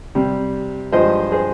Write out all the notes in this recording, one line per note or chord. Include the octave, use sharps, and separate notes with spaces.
C3 G3
G2 F3 G#3 C5 D#5
G#4 C5